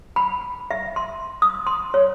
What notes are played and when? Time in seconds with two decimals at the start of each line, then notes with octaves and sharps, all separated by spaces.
0.16 B5
0.71 E5
0.96 C6
1.42 D#6
1.67 C6
1.94 C#5